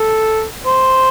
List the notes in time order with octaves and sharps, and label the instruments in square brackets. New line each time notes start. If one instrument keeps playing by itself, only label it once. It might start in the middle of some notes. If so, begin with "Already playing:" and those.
Already playing: [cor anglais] A4
C5